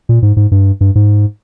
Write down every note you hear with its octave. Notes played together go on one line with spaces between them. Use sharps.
A#2
G#2
G#2
G2
G2
G#2